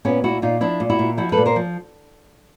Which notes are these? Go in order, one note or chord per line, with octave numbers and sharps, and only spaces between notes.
A#2 B3 C#4
A#2 E4 F#4
A#2 D#4 F4
F3 D4 E4
A#2
E4 F#4
A#2
F3 E4 F#4
A4 B4
A#2
A#4 C5
F3